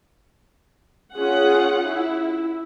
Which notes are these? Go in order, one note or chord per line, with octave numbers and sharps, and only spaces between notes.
C#4 F4 G#4 F#5
E4